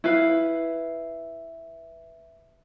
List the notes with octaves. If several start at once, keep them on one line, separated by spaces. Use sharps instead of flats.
E4 B4 F5